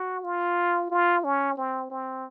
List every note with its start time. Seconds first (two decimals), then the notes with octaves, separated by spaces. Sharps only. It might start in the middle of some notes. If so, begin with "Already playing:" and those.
Already playing: F#4
0.24 F4
0.90 F4
1.24 C#4
1.57 C4
1.90 C4